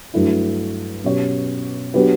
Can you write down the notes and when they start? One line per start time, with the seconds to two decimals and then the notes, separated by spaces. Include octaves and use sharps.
0.14 G2 F#3 A3 E4
1.04 B2 F#3 C#4 G4 C#5
1.94 F#3 B3 D4 G4 B4